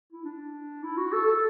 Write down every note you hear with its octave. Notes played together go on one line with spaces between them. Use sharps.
E4
D4
E4
F#4
A4
A4